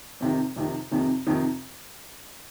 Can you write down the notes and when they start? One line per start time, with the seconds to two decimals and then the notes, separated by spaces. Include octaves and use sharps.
0.20 F2 C3 D#3
0.56 F2 C3 D#3
0.91 F2 C3 D#3
1.27 F2 C3 D#3